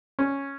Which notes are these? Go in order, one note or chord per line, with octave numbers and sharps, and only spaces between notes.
C#4